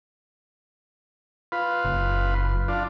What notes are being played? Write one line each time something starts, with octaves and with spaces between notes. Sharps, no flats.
F4 B4
F#1
D4 F4